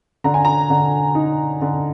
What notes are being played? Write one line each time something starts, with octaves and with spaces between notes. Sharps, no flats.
D3 A#5
G#5
A#5
D3
D#4
D3